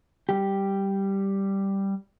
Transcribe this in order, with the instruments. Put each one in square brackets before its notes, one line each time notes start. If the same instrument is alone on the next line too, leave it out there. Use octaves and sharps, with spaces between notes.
[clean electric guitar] G3 G4